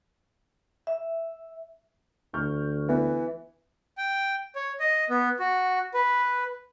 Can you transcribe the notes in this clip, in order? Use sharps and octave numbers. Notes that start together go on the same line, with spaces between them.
E5
D2 C#6 F6 G6
E3 B3
G5
C#5
D#5
B3
F#4
B4